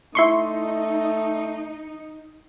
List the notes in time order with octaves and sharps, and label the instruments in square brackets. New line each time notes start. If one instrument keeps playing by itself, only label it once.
[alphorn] A3 [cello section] D#4 [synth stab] E4 C6 C#6